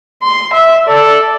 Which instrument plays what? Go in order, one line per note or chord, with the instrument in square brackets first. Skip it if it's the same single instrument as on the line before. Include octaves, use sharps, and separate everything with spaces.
[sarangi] C6
E5
[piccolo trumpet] A4 [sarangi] D5